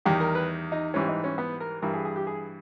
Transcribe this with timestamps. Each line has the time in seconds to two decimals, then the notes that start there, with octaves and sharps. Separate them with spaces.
0.06 E2 D#3 G3 G4
0.20 A#4
0.35 B4
0.72 D#4
0.94 G#2 E3 G3 C#4
1.09 D#4
1.24 C#4
1.38 B3
1.60 A#4
1.82 G2 E3 G3 A#4
1.94 G#4
2.05 G#4
2.16 G4
2.27 G#4